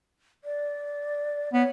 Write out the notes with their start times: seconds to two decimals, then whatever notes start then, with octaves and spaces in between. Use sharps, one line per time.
0.44 D5
1.53 B3 C#5